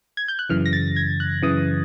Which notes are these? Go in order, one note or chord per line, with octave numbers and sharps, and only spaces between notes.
G#6
G6
F#6
F#2 C#3 E3 F6
A#6
A6
G#6
F#6
F#2 C#3 E3 D#6